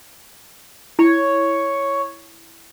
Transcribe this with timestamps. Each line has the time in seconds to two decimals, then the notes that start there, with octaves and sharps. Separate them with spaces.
0.99 E4 C#5